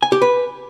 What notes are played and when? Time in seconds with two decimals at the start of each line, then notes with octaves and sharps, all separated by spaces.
0.03 G#5
0.12 G4
0.22 B4